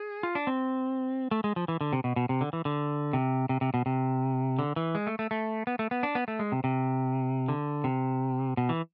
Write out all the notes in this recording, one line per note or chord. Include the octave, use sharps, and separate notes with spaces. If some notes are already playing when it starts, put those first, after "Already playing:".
Already playing: G#4
F4
D4
C4
A3
G#3
F3
E3
D3
C3
B2
B2
C3
D3
E3
D3
C3
C3
C3
B2
C3
D3
E3
G#3
A3
A3
A3
B3
A3
B3
D4
B3
A3
G#3
C3
C3
D3
C3
B2
E3